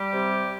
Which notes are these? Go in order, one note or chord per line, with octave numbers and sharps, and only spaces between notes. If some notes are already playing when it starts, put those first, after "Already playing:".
Already playing: G3 G4
C3